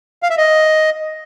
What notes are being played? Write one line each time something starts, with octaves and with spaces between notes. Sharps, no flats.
F5
E5
D#5